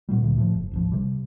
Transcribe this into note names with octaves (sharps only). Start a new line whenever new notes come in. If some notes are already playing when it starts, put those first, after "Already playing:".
A#2 F#3 G3
D2 A#2
A2 F3
F#1
D1 G#1 F3
C3 G3